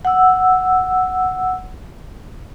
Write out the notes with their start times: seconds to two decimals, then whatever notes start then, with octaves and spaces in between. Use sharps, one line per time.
0.05 F#5 E6